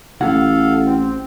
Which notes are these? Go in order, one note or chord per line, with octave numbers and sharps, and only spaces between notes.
A1 E4 F#4 A4 F5 F#5
C4